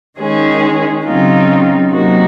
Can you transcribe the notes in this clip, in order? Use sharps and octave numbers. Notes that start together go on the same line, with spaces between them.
D#3 G#3 C#4 G#4
C#3 F#3 C4 D#4 F4
C3 F#3 A#3 D#4 F#4